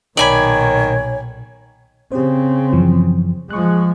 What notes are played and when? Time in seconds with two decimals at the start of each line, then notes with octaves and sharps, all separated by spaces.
0.17 B1 A#2 D#3 C#5 D5 G#5 B5
2.12 C#3 C4 G4 C5
2.73 F#2 E3 F3
3.50 F3 G#3 C#6 F#6